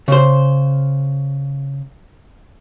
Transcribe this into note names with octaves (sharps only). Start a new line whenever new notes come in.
C#3 C5